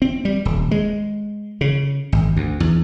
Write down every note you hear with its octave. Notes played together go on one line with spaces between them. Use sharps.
C4
G3
D#1
G#3
C#3
G#1
D2
E2